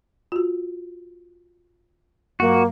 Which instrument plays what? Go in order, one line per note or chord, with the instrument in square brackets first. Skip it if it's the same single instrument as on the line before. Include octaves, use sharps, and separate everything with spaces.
[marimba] F4 F#4
[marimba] G2 F#3 [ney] A#3 [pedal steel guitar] F#4